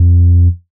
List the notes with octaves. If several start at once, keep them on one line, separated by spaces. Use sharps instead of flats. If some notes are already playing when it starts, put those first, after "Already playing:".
Already playing: F2